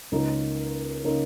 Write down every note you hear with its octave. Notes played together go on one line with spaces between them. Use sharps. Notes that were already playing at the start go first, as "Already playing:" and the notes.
C#2 C#3 A#3 D#4 A#4
C#3 A#3 D#4 A#4